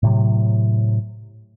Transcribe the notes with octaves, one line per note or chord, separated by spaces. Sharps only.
A2 C3 F#3